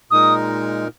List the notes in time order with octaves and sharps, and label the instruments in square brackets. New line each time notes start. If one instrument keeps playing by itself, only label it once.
[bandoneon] A#2 G#3 D#4 A#4 [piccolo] D#6